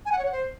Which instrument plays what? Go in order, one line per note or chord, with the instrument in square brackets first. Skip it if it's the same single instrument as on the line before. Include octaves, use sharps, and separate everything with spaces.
[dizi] G#5
F#5
C#5
F#5
C5